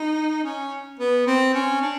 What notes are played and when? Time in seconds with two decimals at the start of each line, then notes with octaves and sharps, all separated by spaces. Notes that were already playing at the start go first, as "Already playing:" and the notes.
Already playing: D#4
0.44 C#4
1.00 B3
1.27 C4
1.54 C#4
1.82 D4